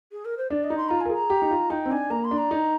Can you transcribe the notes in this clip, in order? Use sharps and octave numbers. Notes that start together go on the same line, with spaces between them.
G#4
A#4
C5
D4 D5
D#5
D#4
C6
F4 A#5
A#4 G#5
G#4 A#5
G4
D#4
F4
D#4 G5
C4
D4 G#5
A#3 A#5
C6
D4
A#5
D#4